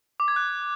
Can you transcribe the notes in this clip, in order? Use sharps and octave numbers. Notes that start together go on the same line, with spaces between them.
D6
G#6
F#6